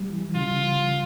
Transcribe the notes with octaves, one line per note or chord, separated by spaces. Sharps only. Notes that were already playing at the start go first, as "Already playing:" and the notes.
Already playing: G3
E3
C#3 F4